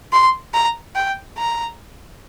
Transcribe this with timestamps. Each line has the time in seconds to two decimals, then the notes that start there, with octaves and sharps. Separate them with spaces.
0.13 C6
0.54 A#5
0.96 G5
1.38 A#5